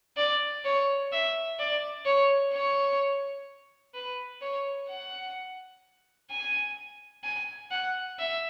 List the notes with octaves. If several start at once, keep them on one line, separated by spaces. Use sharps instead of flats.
D5
C#5
E5
D5
C#5
C#5
B4
C#5
F#5
G#5
G#5
F#5
E5